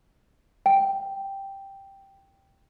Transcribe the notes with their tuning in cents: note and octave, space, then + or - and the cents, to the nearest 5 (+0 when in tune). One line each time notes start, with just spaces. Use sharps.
G5 +0